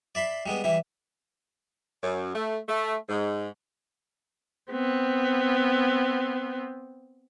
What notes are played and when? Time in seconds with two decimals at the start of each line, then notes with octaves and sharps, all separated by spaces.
0.15 D5 E5 B5 C6
0.46 G3 G#3 B3
0.64 E3 G3 E4
2.02 F#2
2.35 A3
2.69 A3
3.09 G#2
4.72 B3 C4